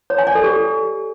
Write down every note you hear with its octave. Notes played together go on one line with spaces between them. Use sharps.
C#5
G#5
D5
A4
G4